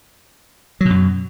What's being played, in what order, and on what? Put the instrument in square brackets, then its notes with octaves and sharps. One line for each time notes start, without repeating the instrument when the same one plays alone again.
[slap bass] F#3
B2
F#2